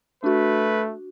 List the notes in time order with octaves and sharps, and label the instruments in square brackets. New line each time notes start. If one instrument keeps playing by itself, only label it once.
[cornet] A3 [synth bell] D4 F#4 [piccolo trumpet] B4